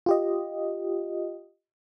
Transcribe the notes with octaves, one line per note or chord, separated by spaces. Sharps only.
F4 G4 D#5